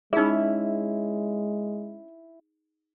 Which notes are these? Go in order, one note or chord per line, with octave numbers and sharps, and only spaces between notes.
G#3 C#4 D#4 E4 G#4 E5